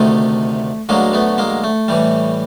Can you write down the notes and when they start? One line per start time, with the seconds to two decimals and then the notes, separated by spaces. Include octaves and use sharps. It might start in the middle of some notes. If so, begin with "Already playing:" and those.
Already playing: D2 C3 D#3 A3
0.89 D2 D3 F#3 G#3 A#3
1.13 A3 B3
1.38 G#3 A#3
1.64 A3
1.88 A2 E3 G3